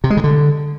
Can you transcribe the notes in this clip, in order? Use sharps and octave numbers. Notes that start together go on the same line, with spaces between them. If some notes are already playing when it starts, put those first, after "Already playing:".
C3
G#3
C#3
D3